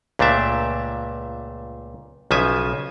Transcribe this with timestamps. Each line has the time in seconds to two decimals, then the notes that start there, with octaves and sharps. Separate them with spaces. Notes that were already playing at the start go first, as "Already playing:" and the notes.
0.19 C#2 A#2 A3 D4 E5
2.31 B1 C#3 F3 E5 G#5